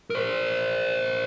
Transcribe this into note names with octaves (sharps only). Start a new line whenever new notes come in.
A#4 C5